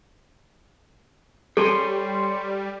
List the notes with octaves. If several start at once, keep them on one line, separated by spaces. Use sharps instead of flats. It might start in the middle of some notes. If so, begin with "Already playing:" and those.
G3 A4 C#5 G#5 C6